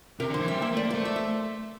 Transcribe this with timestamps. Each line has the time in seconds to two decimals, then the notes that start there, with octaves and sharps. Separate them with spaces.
0.20 C3 A#4
0.30 D3
0.34 C5
0.41 E3
0.48 G3 E5
0.62 A#3 E5
0.73 A3
0.77 D5
0.84 A#3
0.91 A3 C5
1.05 E5
1.16 E5